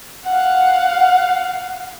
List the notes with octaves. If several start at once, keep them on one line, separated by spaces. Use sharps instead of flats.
F5 F#5